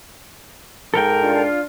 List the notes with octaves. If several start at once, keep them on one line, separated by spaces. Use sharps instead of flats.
G#2 A4 A#4 G5
D4 F4